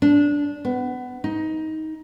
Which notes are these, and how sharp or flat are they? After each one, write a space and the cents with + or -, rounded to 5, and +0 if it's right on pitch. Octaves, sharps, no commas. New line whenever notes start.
D4 -15
B3 +20
D#4 +15